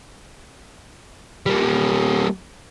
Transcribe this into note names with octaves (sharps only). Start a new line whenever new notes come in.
G3 A#3